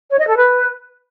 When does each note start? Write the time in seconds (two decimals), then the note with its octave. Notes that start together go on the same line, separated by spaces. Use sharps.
0.11 C#5
0.19 D#5
0.27 A4
0.36 B4